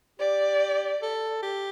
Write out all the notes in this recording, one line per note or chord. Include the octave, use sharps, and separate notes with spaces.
G4 D5
A4
G4